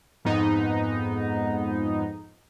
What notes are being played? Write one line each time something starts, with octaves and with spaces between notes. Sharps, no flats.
F2 G#2 B3 D#4